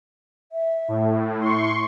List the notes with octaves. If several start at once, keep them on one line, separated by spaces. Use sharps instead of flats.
E5
A2
E4 C6 C#6